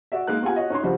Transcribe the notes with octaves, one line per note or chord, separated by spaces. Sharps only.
F#4 D5 E5
G#3 A#3 D#4 A#4 F#6
B3 F4 G4 F#5 G#5
F#4 C#5 D#5
C#4 D#4 C#5 C6
C#3 F3 G3 D4 F#4 C5